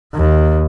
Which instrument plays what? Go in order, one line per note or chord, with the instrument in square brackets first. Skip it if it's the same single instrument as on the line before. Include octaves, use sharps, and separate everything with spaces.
[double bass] D#2